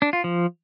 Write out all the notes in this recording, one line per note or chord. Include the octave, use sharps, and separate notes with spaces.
D4
F4
F3